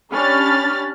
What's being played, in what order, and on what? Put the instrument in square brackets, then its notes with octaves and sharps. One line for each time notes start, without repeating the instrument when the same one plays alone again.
[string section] C#4 D4 G4 B5 F6 A6